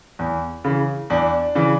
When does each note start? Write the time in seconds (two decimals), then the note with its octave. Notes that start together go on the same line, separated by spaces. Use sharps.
0.19 E2
0.65 C#3 E3
1.10 E2 D4
1.55 C#3 E3